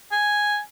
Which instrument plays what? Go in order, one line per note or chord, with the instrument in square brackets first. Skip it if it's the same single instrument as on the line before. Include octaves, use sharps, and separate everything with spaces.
[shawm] G#5